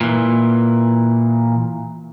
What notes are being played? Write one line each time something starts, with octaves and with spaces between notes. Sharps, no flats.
A#2 E3